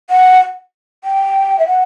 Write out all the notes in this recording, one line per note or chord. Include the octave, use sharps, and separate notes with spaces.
F#5
G5
E5
F#5